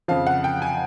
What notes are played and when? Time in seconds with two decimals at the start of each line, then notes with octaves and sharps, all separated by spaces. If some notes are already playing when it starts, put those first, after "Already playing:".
0.08 F2 C#3 F3 F5
0.27 F#5
0.44 G5
0.62 G#5